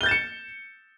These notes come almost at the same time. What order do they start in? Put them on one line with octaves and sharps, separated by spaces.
G7 G6 A6 E7 C#7